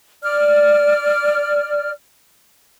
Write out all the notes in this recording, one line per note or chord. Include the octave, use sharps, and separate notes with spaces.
D5 F6